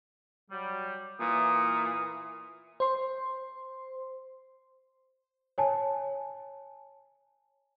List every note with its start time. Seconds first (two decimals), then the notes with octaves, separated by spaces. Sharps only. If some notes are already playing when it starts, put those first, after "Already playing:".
0.51 F#3 G3
1.20 A#2 E3 D#6
2.80 C5 C6
5.58 C#5 G#5 A5